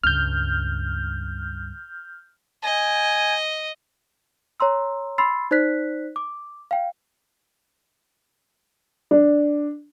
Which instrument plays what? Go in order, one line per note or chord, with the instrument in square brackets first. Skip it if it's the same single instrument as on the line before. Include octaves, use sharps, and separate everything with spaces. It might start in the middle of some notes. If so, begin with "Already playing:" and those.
[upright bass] C#2 G2 [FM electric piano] F6 G6
[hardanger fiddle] D#5 [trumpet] G#5
[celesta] C#5 A#5 C6 E6
B5 C6 E6 A6 C7
D#4 C5 D5 F#6 B6
D6
F5 G5
[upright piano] D4